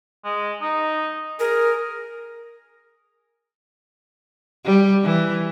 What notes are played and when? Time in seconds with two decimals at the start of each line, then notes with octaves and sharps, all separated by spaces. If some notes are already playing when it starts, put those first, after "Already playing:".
0.24 G#3
0.62 D#4
1.40 G#4 A#4
4.65 G3
5.03 E3